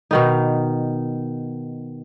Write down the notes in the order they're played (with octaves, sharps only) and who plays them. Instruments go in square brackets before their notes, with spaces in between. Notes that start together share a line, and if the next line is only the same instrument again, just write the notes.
[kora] B2 D#3 D#4